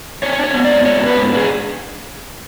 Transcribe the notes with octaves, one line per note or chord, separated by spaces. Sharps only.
D4 C#5
D4
C#5
B3
D5
G#2
G#2 C#5
B3
B4
G#2
D4
G#4